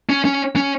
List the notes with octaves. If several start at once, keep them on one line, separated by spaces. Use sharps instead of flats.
C#4
C#4
C#4